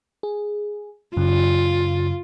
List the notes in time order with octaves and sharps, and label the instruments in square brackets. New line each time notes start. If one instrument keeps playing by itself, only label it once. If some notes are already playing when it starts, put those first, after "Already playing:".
[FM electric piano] G#4
[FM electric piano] F#2 C#3 [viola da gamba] F4